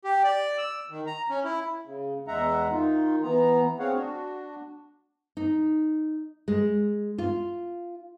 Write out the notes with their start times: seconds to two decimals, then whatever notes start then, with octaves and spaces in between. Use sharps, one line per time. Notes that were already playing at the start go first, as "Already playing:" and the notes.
0.04 G4
0.24 D5
0.58 E6
0.90 D#3
1.07 A#5
1.30 C#4
1.45 E4
1.85 C#3
2.28 E2 G#3 E5 F#5 A#5
2.71 D#3 D#4 F4
3.23 E3 B3 A#5
3.79 C4 G#4 C#5 F5 F#5
3.94 D4 F#4
5.37 D#4
6.48 G#3
7.18 F4